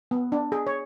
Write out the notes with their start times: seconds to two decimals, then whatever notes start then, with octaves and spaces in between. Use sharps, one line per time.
0.11 B3
0.32 D4
0.52 G#4
0.67 C#5